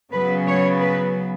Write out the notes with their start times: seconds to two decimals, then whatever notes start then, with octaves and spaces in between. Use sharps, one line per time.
0.12 C#3 F#3 B3 B4
0.47 C#5
0.80 B4